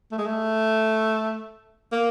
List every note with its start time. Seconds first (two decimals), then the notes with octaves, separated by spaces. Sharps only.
0.12 A3
0.18 G#3
0.26 A3
1.92 A#3